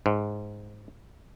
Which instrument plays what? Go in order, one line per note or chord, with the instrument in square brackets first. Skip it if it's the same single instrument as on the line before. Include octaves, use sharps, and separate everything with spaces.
[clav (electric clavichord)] G#2